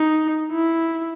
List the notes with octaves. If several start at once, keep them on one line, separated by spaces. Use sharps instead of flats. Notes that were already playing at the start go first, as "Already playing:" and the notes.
Already playing: D#4
E4